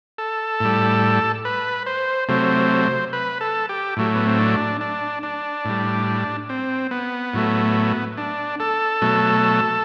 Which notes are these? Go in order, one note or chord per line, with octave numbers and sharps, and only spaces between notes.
A4
A2 G3
B4
C5
C3 F#3 A3 C5
B4
A4
G4
A2 F#3 A3
B3
C4
D4
D4
D4
A2 G3
C4
B3
A2 F#3 A3
D4
A4
B2 F#3 A3